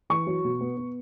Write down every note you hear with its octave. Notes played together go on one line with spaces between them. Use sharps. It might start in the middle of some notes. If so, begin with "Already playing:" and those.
E3 C#6
F#3
B2
B3
B3